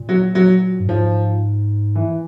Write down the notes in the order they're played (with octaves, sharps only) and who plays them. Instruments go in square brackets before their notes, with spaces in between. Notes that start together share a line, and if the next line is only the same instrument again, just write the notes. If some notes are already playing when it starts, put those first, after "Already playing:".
Already playing: [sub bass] A#2
[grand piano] F#3
F#3
[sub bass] G2
[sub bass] G#2 [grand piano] F3
[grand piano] E3